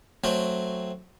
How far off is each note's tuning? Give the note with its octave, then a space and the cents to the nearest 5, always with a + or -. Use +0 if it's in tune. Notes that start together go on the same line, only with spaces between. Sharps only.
F#3 -10 A3 +0 C4 +0